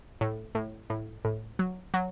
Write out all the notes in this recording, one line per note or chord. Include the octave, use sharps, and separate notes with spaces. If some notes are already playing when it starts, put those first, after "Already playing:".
A2
A2
A2
A2
F#3
F#3